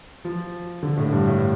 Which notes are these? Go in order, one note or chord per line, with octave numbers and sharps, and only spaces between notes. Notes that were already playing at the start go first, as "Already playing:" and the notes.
F3
D3
A2
G2
A2